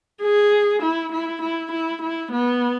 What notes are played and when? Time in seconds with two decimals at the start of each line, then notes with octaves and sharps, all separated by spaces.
0.22 G#4
0.83 E4
1.13 E4
1.42 E4
1.72 E4
2.02 E4
2.32 B3